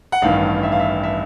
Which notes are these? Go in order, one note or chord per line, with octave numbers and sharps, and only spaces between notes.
F#5
A1 G2 D#3 F5
E5
F5
E5
E5